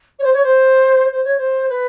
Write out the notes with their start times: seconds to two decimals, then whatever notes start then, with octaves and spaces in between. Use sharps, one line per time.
0.19 C#5
0.23 C5
0.33 C#5
0.43 C5
1.12 C5
1.24 C#5
1.38 C5
1.69 B4